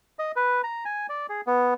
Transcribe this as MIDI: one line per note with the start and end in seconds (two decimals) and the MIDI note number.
0.19 0.32 75
0.36 0.62 71
0.63 0.84 82
0.85 1.07 80
1.09 1.27 74
1.29 1.41 68
1.47 1.74 59